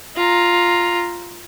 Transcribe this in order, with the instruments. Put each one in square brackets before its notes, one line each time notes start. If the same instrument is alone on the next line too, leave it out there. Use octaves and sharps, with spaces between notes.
[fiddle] F4 A#5